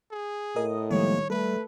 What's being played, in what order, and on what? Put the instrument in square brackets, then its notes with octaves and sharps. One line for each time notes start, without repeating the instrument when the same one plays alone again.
[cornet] G#4
[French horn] A2 [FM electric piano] A#4 D#5 D#6
[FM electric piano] D#3 G3 [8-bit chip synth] F3 G#3 A#3 [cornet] C#5
[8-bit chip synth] G3 [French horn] A3 [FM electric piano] A4 [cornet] B4